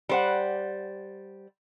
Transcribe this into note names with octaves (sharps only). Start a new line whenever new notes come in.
G3 C5 F#5